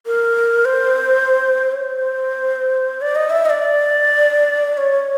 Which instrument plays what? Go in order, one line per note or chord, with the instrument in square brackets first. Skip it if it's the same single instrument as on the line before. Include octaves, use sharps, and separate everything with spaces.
[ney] A#4
C5
C#5
C5
D5
D#5
E5
D#5
D5
C#5